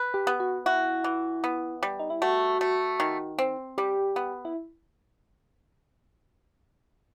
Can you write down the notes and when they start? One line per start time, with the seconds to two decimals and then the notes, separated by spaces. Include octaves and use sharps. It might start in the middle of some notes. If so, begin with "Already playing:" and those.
Already playing: B4
0.14 G4
0.27 B3
0.40 F#4
0.66 E4 F#4
1.04 E3
1.44 B3
1.83 G3
1.99 D#4
2.10 E4
2.22 A3 F#4
2.61 A3
3.00 D#3
3.39 C4
3.78 G3 G4
4.16 B3
4.45 E4